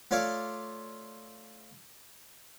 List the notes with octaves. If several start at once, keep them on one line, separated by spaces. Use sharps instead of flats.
A3 F4 C#5 D5 F5